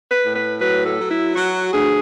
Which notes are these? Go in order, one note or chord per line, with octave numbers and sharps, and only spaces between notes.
B4
A2
B4
F#3 B4
A4
F#3
E4
F#3 F#4
D2 G#4